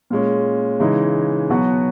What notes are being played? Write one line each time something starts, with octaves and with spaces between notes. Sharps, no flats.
A#2 G#3 C#4
C#3 E3 G#3 D#4
B2 F#3 B3 F#4